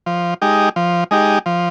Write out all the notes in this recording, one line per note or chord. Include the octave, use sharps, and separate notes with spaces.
F3
G#3 D#4 G4
F3
G#3 D#4 G4
F3